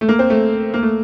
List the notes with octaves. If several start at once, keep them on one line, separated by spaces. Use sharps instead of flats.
A3
A#3
C4
A3
A#3
A3